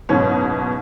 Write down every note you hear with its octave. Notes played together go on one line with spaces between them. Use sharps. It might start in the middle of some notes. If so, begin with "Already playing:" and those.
F#1 G#2 B2 C#4